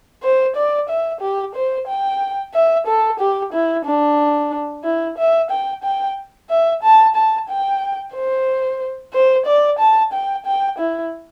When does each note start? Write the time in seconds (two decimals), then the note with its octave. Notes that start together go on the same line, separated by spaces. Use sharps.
0.23 C5
0.56 D5
0.89 E5
1.21 G4
1.55 C5
1.88 G5
2.54 E5
2.87 A4
3.19 G4
3.53 E4
3.85 D4
4.84 E4
5.18 E5
5.51 G5
5.84 G5
6.50 E5
6.83 A5
7.16 A5
7.49 G5
8.14 C5
9.13 C5
9.46 D5
9.79 A5
10.13 G5
10.46 G5
10.79 E4